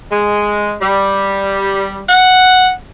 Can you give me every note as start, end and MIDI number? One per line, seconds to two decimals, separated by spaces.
0.12 0.73 56
0.81 2.02 55
2.09 2.71 78